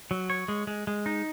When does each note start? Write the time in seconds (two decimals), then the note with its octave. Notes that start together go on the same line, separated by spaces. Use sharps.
0.11 F#3
0.30 C#5
0.48 G#3
0.67 G#3
0.87 G#3
1.06 D#4